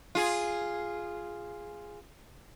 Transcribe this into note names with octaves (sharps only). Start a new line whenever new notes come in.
F4 G#4